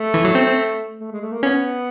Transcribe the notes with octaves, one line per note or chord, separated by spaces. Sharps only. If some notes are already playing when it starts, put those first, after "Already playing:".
Already playing: A3
E3
F#3
C4
C4
A3
G#3
A3
A#3
B3 C#4